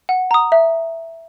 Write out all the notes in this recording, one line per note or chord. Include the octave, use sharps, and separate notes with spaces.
F#5
A#5 D#6
E5